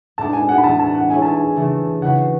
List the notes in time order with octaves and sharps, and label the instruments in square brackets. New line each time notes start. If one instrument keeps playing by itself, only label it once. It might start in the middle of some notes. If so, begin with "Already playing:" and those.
[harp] A2 G#3 B3 D4 [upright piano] A5
[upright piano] G#5
F#5
B5
[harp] A2 E3 A3 [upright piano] A5
[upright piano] A5
F#5
[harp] B3 E4 G#4 C#5 [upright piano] G#5
[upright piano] A5
G#5
[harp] C#3 E3 A3
[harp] C#3 E3 B3 F#4 B4 [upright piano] F#5